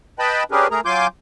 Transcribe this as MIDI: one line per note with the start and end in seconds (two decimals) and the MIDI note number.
0.19 0.43 71
0.19 0.43 75
0.19 0.43 79
0.19 0.43 81
0.19 0.43 83
0.51 0.67 61
0.51 0.67 62
0.51 0.67 67
0.51 0.67 68
0.51 0.67 70
0.51 0.67 71
0.71 0.80 57
0.71 0.80 68
0.71 0.80 70
0.71 0.80 82
0.85 1.07 54
0.85 1.07 65
0.85 1.07 80
0.85 1.07 84
0.85 1.07 86
0.85 1.07 91